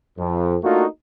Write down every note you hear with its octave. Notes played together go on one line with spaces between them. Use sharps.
F2
A3 A#3 D4 D#4 F4 F#4